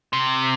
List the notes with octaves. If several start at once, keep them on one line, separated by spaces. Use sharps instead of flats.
C3